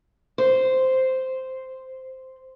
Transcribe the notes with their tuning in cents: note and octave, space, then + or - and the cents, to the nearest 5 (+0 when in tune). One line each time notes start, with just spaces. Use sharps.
C5 -5